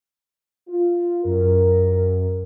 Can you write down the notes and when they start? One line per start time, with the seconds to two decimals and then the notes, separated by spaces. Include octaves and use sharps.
0.69 F4
1.24 F#2 A#4